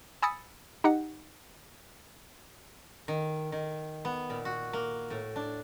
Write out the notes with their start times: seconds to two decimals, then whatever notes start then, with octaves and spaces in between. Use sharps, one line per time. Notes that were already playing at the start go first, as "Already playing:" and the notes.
0.22 G#5 B5 D#6 E6 A6 C#7
0.84 D#4 G4 F#5 C#7
3.08 D#3
3.52 D#3
4.05 B3
4.30 A#2
4.45 F#4
4.73 A#3
5.10 A2
5.36 D4